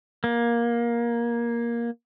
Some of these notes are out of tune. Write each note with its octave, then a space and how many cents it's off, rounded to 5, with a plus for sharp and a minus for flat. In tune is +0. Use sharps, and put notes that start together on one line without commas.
A#3 +15